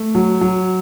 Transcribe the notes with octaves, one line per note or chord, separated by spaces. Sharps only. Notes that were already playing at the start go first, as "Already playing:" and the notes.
Already playing: A3
F#3
F#3